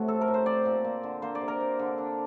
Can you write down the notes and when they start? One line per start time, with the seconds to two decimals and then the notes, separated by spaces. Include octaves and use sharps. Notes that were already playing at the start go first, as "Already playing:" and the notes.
Already playing: A2 C3 A3 F#4
0.08 C4 A4
0.21 A#4
0.28 A2
0.34 C5
0.46 C4 D5
0.65 A#2
0.84 A#3
1.03 D3
1.22 A#3 C5
1.35 D5
1.41 C3
1.48 A#4
1.60 C4
1.79 D3
1.98 D4